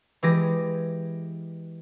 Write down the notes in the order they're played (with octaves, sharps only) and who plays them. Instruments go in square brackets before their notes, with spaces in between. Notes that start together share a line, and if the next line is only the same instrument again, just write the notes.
[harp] E3 G#3 G4 A#6